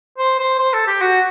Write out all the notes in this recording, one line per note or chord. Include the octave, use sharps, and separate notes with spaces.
C5
C5
C5
A4
G4
F#4